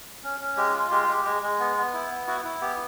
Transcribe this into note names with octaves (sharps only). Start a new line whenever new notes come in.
C#4
C#4
G#3 G4
F4
G#3 G4
G#3
G#3
G#3
B3
B3
E4
B3
E4 F#4
E4
B3 G4